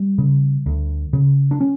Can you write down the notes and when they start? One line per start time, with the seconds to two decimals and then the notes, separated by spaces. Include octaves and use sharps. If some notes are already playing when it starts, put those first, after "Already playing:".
Already playing: G3
0.18 C#3
0.66 D2
1.13 C#3
1.51 D4
1.61 C#4